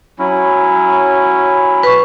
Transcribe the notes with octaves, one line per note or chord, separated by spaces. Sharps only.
F#3 C#4 E4
B4 C#6